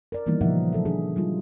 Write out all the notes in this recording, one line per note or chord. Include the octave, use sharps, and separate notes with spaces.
A#4 D5
D#3 E3 G3 A#3 B3 D#4
A#2 C#3 F3 D#4 E5 F#5
F#3 A4 E5
F3 D4 G#4
F#3 G3 D#4 F4